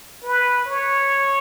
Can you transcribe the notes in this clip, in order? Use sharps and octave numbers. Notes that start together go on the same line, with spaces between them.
B4
C#5